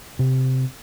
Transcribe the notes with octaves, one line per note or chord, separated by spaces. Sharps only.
C3